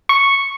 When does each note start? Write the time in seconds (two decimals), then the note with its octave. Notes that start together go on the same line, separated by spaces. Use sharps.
0.09 C#6